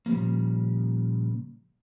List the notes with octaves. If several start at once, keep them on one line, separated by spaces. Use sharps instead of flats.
A#2 C#3 F3 G3 A#3